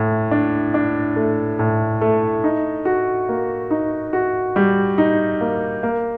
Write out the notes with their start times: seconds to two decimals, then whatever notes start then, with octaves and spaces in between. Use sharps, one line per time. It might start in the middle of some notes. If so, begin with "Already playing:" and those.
Already playing: A2
0.31 D4
0.74 D4
1.16 A3
1.59 A2
2.01 A3
2.44 D#4
2.85 F#4
3.29 A#3
3.70 D#4
4.13 F#4
4.56 G3
4.98 D#4
5.41 A#3
5.83 A#3